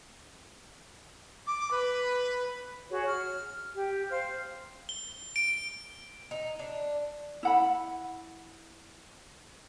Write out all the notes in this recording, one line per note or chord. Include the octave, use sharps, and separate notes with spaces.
D6
B4
F#4 G#4 C#5
F6
G4
C5 F5 F6
G7
D7
D#4
D4
E4 F#5 B5